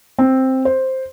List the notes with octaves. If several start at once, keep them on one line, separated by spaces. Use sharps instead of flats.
C4
C5